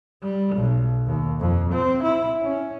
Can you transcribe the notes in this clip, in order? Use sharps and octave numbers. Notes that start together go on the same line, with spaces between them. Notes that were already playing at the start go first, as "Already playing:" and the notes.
G3
B1
D#2
F2
C4
E4
C#4